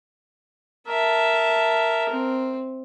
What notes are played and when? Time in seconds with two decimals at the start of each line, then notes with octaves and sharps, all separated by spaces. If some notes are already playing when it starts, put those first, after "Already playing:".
0.88 A#4 E5 A5
2.09 C4